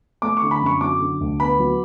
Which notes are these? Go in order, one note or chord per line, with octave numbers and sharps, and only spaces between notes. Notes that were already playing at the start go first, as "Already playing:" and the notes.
A3 D6
C#6
D3
B5
F#2 C#6
F#3 D6
D3
D2
B3 B5
F#3